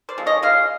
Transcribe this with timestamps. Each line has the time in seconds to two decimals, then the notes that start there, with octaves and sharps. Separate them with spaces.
0.09 C5 D5
0.18 F3 G#3 C4
0.26 C#5 D#5
0.42 C#3 D#5 F5